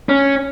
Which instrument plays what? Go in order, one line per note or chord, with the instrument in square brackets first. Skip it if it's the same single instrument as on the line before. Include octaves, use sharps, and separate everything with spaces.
[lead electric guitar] C#4